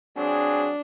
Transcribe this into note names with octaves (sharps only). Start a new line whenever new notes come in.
F#3 C4 D4 G#4